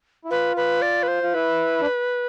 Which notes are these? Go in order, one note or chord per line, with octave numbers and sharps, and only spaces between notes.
E4
F4 B4
B4
D5
B4
C5
F4
E4 B4
D4